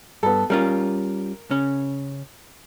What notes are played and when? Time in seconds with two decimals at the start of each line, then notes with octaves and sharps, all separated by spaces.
0.23 G2 B3 A4
0.50 G3 C#4 F4 A#4
1.51 C#3 C#4